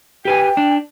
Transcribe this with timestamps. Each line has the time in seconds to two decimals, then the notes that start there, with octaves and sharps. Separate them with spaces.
0.25 G4 B4 G5 G#5
0.57 D4